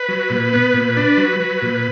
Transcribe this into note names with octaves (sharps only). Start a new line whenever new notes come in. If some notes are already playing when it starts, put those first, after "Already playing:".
Already playing: B4
F#3
A#2
B3
A#2
D4
F#3
F#3
A#2